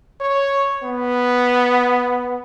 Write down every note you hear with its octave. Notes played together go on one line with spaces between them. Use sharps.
C#5
B3